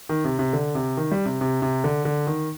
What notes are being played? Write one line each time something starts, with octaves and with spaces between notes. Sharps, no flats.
D#3
C3
C3
D3
C3
D#3
G3
C3
C3
C3
D3
D3
D#3